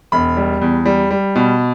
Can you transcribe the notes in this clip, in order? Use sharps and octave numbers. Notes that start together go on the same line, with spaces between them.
E1 B5
G3
E2
G3
G3
B2